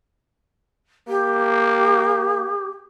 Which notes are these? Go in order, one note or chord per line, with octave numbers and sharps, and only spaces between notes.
A#3 G4